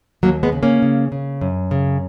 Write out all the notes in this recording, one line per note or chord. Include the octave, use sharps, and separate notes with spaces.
D#2 F#3 A#3
G#3 B3
C#3
A#3 C#4
C#3
C#3
F#2
C#3